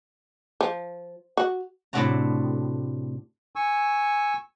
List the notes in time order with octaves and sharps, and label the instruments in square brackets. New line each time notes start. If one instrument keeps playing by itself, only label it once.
[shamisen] F3
F#4
[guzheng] A2 C3 A3 D4 F#4 A#5
[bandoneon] G#5 C#6 E6